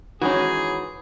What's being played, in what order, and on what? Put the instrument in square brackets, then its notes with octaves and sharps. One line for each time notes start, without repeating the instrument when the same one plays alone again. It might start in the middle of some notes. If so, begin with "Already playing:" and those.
[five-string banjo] D#3 G#3 C#4 [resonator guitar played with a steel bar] E3 [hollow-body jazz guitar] F#4 [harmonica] G#4